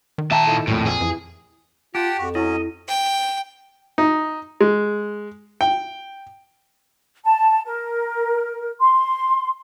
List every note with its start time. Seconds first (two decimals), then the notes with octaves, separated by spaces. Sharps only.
0.18 D#3
0.31 A#2 E5 G5 A5 A#5
0.47 D#4 E4 A4
0.67 A#1 F2 A2
0.86 G#4
1.00 F2 E3
1.95 F4 G4 F#5 G5 A5
2.18 F2 F#4
2.35 F#3 C#4 E4 D#5
2.88 G5
3.98 D#4
4.61 G#3
5.61 G5
7.25 A5
7.66 A#4
8.80 C6